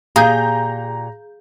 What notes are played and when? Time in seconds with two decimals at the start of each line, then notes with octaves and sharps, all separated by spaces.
0.16 A#2 G4 G#4 F5 A#5 G6